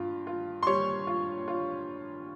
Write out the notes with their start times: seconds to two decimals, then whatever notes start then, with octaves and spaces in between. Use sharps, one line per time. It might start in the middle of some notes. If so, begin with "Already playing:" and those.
Already playing: G2 F4
0.27 F4
0.63 C6
0.67 G3 C#5 C#6
1.07 F4
1.48 F4